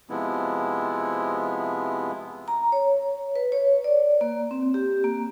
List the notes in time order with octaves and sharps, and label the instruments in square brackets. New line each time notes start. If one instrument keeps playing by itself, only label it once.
[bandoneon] C3 F3 G#3 B3 E4
[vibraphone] A#5
C#5
B4
C#5
D5
A#3
C4
G4
A#3